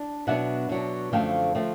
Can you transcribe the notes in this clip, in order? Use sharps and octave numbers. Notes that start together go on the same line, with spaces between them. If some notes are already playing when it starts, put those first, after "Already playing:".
Already playing: D4
B2 F#3 B3 D4 E5 F#5
B2 F#3 B3 D4
F#2 D3 F3 A3 C4 F5 G5
D3 F3 A3 C4